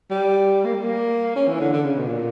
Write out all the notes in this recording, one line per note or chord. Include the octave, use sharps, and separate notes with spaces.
G3
A#3
G3
A#3
C#4
E3
D3
D3
C#3
B2
A#2